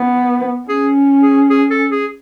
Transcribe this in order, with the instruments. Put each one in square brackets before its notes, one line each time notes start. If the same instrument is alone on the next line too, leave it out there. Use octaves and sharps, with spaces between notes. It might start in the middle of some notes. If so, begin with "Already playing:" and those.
Already playing: [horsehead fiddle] B3
[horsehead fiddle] C#4 [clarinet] G#4
[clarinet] G#4
G#4
A4
G#4